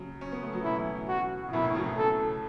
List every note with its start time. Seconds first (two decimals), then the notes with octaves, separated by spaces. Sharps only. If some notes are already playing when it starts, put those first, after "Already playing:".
Already playing: C#3 F#3
0.21 C#4
0.32 B3
0.43 A3
0.53 F#3
0.64 B2 E3 E4
1.09 F#4
1.48 C#3
1.53 F#2 B2 E4
1.64 A2 C#3
1.75 C#3 F#3
1.86 A2 C#3
1.98 A4